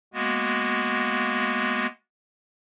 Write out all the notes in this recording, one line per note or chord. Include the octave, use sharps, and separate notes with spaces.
G#3 A#3 B3 F#4